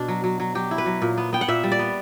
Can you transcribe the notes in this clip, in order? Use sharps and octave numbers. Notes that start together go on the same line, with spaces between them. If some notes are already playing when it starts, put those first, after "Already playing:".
Already playing: B2 D4
F#3
F#3
F#3
F#3 G4
E4
B4
F#3
A#2
B3
B3 G5
F#5
A#2 E5
G3
D5
B3